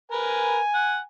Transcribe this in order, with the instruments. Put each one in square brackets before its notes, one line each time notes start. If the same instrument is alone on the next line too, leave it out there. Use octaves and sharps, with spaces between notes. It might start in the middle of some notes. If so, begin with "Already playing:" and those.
[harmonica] A#4 B4 [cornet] G#5
[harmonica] F#5